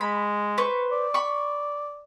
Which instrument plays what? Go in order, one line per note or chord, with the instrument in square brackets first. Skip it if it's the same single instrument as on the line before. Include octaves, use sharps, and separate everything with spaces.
[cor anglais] G#3 [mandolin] B5
[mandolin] B4 C5 C#6
[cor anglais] D5
[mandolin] B5 C#6